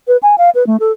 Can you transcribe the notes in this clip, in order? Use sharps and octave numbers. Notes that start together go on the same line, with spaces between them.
B4
G#5
F5
B4
A3
A4